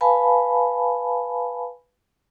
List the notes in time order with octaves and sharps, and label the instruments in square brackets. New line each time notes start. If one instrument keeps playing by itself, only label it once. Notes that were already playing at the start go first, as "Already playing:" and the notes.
[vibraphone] B4 F5 G#5 A5 B5